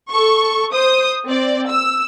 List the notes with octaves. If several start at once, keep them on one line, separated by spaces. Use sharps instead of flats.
A4 C#6
C5 D#6
C4 D5
E6